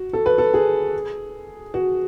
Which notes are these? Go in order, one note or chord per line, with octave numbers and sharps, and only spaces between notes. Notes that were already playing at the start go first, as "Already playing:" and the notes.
Already playing: F#4
A4
B4
A4
G#4
F#4